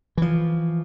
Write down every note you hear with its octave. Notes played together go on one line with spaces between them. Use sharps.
E3 F3